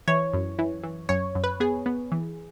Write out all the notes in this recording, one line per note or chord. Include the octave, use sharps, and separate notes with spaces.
E3 C#5
F#2
E3
E3
F#2 C#5
F#2
B4
B3 G#4
B3
E3